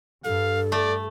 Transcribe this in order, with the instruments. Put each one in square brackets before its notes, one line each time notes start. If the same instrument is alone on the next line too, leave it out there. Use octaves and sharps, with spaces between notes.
[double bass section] G2 [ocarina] A4 [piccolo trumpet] F5
[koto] A3 [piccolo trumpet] D5